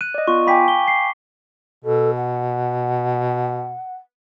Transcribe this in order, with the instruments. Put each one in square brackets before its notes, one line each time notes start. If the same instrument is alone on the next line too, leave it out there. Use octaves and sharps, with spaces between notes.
[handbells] F#6 [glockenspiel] D#7
[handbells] D5 D#5
[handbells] B3 F4 [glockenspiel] C#6
[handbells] F5 G5 G#5 [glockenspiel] B5 D6 B6
[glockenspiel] G7
C7
[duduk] B2 [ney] A4
[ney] F#5